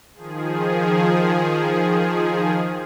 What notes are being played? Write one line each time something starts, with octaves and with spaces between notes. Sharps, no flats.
D#3 F3 G#4